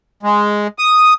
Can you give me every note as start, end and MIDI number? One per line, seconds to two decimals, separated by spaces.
0.23 0.67 56
0.79 1.14 87